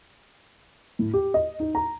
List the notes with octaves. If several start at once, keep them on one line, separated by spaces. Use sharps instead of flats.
A2
G4
D#5
D#4
A#5